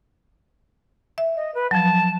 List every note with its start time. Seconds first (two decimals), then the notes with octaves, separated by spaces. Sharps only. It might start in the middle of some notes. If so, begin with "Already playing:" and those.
1.18 E5
1.36 D#5
1.54 B4
1.71 F3 F#3 A5